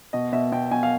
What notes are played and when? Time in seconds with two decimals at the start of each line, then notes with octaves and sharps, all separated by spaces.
0.13 B2 D#5
0.33 B2 E5
0.52 B2 G5
0.71 B2 G#5
0.83 F5